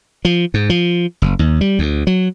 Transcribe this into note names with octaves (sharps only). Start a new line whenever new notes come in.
F3
G#2
F3
F#1
D#2
G3
D2
F#3